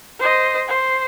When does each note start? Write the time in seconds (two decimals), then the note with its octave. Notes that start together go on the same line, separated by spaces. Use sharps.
0.19 C5 D#5
0.68 C5